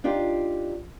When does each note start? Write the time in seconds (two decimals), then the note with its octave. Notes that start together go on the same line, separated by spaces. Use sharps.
0.04 D4 D#4 F4 G4